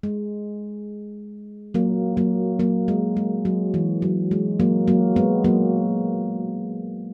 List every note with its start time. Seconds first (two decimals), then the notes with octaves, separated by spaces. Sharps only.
0.03 G#3
1.74 F#3 A#3
2.17 F#3 A#3
2.59 F#3 A#3
2.88 G#3
3.17 G#3
3.45 F#3
3.74 E3
4.02 F#3
4.31 G#3
4.59 F#3 A#3
4.88 F#3 A#3
5.16 G#3 B3
5.44 F#3 A#3